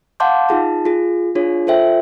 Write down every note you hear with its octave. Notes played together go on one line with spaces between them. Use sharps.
F5 F#5 A5 C6 D6 G6
D#4 F4 G#4 A5
F4 G#4
D4 F4 G#4 C#5
F4 A4 C5 E5 G5